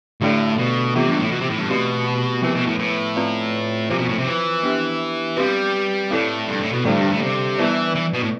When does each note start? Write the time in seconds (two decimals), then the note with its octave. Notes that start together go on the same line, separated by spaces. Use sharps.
0.21 A2 D3 A3 D4 A4 D5
0.58 B2
0.95 C3 E3 B3 F4
1.08 G2
1.16 B2
1.20 A2
1.32 B2
1.41 C3
1.50 A2
1.59 G2
1.68 B2 A3 C4 G4
2.43 C3 F3 B3 E4 B4
2.55 B2
2.67 A2
2.79 A2
3.16 C4 F4 B4 D5
3.90 C3 F3 C4 F4 C5
3.99 B2
4.09 A2
4.18 C3
4.26 E3
4.63 B3 D4 G4
5.37 G3 C4 G4 B4
6.11 A2 C4 E4 A4 D5
6.48 G2
6.60 A2
6.73 B2
6.85 A2 D3 G3 D4 A4 D5
6.97 G2
7.09 A2
7.22 C3
7.58 E3 G3 B3 E4 B4 D5
7.95 E3
8.14 B2
8.23 A2